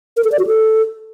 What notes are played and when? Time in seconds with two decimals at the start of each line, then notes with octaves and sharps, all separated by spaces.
0.17 A#4
0.24 A4
0.32 D5
0.39 F#4
0.47 A4